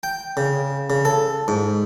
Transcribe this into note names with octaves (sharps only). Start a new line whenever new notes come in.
G5
C#3
C#3
A4
G#2